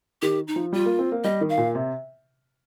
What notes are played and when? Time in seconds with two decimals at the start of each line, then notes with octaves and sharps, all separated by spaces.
0.22 D#3 G4
0.48 D#4
0.56 F3
0.73 G3 F4
0.86 A#3
0.99 C4
1.12 A#3
1.24 G3 D#5
1.41 D#3
1.49 F5
1.58 A#2
1.75 C3